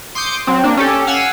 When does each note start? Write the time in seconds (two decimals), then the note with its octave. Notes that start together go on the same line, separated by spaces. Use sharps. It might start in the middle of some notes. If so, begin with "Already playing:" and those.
0.15 C6 D6 D#6 G6 C#7
0.47 F#3 C4
0.64 A#3 D4
0.77 C#4 G4 A4
1.07 F5 F#5 G#5 E6